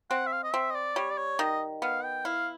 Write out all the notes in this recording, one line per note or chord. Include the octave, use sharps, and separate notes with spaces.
C4 F#5
E5
F5
D#5
C4 E5
D#5
D5
G3 C#5
D5
C#5
D#3 D#5
B3 F5
G5
E4 F5